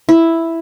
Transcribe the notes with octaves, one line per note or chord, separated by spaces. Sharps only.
E4